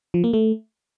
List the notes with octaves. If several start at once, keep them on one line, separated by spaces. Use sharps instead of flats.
F3
A#3
A3